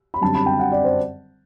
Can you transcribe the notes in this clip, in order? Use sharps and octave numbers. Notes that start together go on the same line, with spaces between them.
B5
F#2 D3 G3 C4 A5
B5
G5
F#5
D5
C5